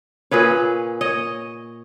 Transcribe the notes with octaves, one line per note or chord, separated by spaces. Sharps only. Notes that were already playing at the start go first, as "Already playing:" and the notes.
A#2 G#4 B4 C#5
C#5 D#5